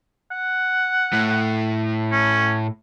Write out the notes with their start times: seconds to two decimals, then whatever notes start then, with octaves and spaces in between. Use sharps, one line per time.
0.31 F#5
1.13 A2
2.12 C#4